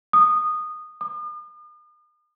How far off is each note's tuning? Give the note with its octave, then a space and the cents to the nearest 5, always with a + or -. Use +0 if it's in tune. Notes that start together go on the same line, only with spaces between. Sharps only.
D#6 -15
D#6 -45